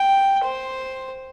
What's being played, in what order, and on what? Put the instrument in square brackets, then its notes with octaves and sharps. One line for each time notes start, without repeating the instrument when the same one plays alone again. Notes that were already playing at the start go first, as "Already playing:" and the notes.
Already playing: [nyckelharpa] G5
C5